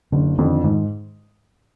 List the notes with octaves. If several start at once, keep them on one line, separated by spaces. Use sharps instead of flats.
F#1 D3
F2 D3 D#3
G#2 D#3